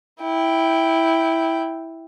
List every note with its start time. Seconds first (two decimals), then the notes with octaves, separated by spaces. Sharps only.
0.22 E4 G5